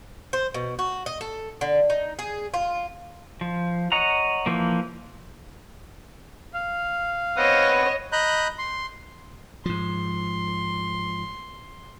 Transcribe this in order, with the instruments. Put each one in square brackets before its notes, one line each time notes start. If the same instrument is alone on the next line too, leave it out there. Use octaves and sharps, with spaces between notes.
[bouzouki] C5
B2
F#4
D#5
A4
D3
D#4
G#4
F4
[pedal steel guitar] F3
C#5 D#5 F#5 A#5
E3 F3 A#3
[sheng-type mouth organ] F5
[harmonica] C4 B4 F#5 [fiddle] C#5 D#5
[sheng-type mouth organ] D#5 A#5 B5 F#6 G6
C6
[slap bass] G#2 F3 [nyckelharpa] C6